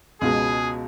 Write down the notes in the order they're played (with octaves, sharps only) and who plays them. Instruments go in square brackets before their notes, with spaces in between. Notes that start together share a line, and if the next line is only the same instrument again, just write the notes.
[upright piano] C#2 B2 G#3 [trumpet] G#4